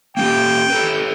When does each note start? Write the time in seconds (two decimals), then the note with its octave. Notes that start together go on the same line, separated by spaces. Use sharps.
0.17 A#3 C#4 G4 G5
0.70 G4 A4 B4